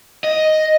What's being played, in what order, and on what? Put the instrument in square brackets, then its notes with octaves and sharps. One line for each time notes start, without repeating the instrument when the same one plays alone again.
[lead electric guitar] D#5